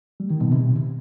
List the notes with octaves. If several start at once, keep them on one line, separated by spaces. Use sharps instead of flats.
G3
D#3
B2
C3